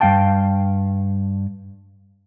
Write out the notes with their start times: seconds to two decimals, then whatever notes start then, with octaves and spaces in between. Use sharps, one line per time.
0.01 G2 A3 F5 G5 A5